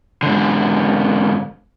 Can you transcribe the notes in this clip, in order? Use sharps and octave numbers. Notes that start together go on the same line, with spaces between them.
G#2 D3